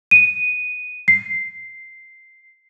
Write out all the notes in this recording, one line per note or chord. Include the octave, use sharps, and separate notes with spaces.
D#7
C7